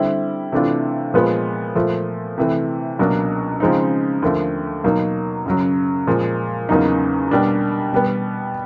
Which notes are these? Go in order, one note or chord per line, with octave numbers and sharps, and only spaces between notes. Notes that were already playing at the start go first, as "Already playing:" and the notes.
Already playing: D3 G3 C4 E4
C3 E3 A3 D4 F4
A#2 F3 G#3 B3
A#2 F3 A3
C3 E3 A3
C#2 B2 F#3 A#3 D4
C#3 F3 G#3 C4 D#4
D#2 D3 F3 A3
B2 F#3 A#3 D#4
F#2 C#3 F#3
A#2 F3 G#3
E2 C#3 F#3 A#3 D#4
B2 G3 A#3 D4
B2 G3 B3